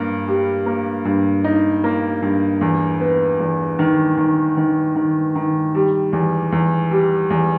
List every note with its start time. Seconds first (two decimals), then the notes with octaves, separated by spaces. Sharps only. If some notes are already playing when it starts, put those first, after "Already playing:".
Already playing: G2 A#3
0.28 G3
0.66 A#3
1.05 G2
1.44 D#4
1.84 A#3
2.22 G2
2.61 E2
3.00 B3
3.40 E2
3.79 D#3
4.17 D#3
4.57 D#3
4.95 D#3
5.35 D#3
5.75 G3
6.13 E2
6.52 E2
6.91 G3
7.30 E2